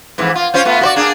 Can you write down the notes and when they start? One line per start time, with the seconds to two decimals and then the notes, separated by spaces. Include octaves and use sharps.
0.18 F2 G#2 E3
0.35 F4
0.54 C#4 F4 C5
0.65 A3 B3 F4
0.81 F#4 C5 D5
0.96 A#3 D4 G#4